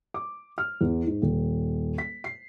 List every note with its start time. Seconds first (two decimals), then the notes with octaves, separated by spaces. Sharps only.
0.14 D6
0.58 F6
0.81 E2
1.07 G#2
1.22 D#1
1.98 B6
2.24 C7